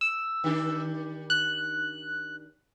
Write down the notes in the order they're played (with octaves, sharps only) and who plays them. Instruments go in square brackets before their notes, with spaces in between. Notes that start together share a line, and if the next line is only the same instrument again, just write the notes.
[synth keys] E6
[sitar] D#3 D4 G4
[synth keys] F#6